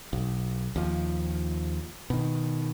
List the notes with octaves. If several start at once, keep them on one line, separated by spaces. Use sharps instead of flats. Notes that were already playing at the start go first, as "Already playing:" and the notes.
B1
D#2 F3
B2 D#3